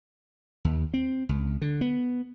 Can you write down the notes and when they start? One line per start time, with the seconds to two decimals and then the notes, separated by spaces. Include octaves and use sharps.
0.65 D#2
0.94 C4
1.29 C#2
1.62 D3
1.81 B3